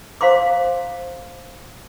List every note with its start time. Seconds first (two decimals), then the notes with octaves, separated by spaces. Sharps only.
0.21 C5 F5 A#5 C6 D6